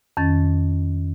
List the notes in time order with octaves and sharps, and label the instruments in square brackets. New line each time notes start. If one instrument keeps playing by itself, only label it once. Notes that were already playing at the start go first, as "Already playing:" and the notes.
[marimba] F2 D#3 C#4 A6